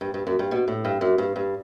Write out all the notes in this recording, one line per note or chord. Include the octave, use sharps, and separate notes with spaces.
G2
G2
F#2
G2
B2
A2
G2
F#2
G2
G2